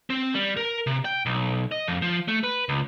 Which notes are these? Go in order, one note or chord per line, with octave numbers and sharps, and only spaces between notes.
C4
G3
A#4
C3
G5
B1
D#5
F2
F3
A3
B4
C#2